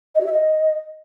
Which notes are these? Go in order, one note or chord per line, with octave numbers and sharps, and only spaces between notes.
D#5
F#4
E5
D#5